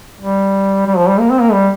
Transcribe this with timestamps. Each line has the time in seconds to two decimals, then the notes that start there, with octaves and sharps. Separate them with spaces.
0.21 G3
0.87 G3
0.97 F3
1.08 G3
1.19 A#3
1.30 C4
1.41 A#3
1.52 G3